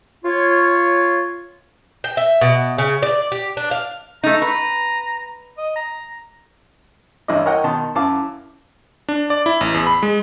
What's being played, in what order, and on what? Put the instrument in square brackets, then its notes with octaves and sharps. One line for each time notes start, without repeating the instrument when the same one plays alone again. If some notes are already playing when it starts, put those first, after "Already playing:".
[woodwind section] F4 C#5
[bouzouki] G5
E5
B2
C#3
D5
G4
D4
F5
[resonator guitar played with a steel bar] A3 D#4 [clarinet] A#5
[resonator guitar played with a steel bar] B4
[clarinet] D#5
A#5
[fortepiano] A1 G2 E4 D#5
A#4 C#5 D#5 F#5 G5
B2 D#3 A5 C6
F#2 E4 F5 A5 D6
[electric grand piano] D4
D5
E4
A1
E2
B5
G#3